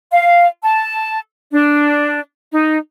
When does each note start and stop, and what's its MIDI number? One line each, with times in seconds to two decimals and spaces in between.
0.11 0.46 77
0.63 1.17 81
1.51 2.19 62
2.52 2.75 63